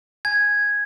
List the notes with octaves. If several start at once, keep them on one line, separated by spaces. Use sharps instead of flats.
G#5 G#6